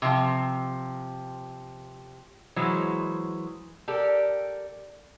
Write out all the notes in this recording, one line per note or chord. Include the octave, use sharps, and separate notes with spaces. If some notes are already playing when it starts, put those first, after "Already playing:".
C3 F3
E3 F#3 G#3 C5 C#5
G4 A4 A#4 D5